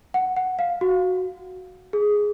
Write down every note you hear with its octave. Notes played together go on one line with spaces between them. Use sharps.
F#5
F#5
F5
F#4
G#4